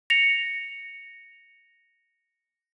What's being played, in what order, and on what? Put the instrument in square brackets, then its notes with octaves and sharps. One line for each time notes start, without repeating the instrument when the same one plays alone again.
[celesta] A#6 C#7 F7